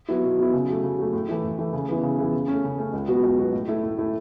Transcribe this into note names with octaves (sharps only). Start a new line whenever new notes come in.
F#3 B3 E4
B2
F#3 B3 E4
C#3
F#3 A3
C#3
F#3 A3
A2
E3 A3 E4
A2
E3 A3 E4
C#3
E3 B3 E4
C#3
E3 B3 E4
C#3
A3 C#4
C#3
A3 C#4
C#2
B2 F#3 B3 F#4
C#2
B2 F#3 B3 F#4
A2
A3 E4
A2
A3 E4